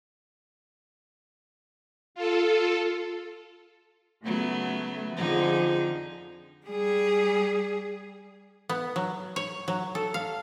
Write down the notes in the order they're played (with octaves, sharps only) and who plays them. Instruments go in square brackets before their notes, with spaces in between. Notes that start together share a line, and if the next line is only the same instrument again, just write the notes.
[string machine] F4 A4
[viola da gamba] C#3 F#3 B3 [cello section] A3
[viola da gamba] F2 D3 D#4 [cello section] F3 G#4
[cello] G3 G#4
[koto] B3
F#3
C#5
F#3
A4
F5